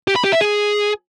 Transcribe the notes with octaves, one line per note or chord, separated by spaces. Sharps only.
G4
B5
G4
E5
G#4